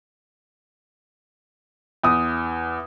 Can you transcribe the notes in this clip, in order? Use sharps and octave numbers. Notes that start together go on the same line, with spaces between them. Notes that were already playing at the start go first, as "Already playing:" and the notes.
E2 D#6